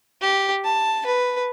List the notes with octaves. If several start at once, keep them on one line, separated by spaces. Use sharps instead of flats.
G4
A5
B4